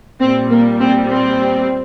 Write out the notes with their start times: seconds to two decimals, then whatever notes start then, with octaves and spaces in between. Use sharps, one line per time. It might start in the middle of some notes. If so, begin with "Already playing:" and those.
0.20 A#2 C4
0.24 G3
0.50 A#3
0.79 C4
1.09 C4